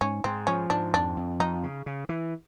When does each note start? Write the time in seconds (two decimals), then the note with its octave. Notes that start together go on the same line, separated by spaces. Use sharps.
0.01 G#2 C#4
0.24 G#2 C4
0.47 F3 C#4
0.70 G#2 D4
0.93 F2 D4
1.17 F2
1.39 F2 D#4
1.63 C#3
1.86 C#3
2.09 E3